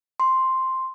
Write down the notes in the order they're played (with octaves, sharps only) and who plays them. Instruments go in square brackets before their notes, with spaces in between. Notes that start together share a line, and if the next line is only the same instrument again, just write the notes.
[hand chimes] C6